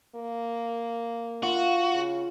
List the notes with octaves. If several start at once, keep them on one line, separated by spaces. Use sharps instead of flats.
A#3
F4 F#4
C#3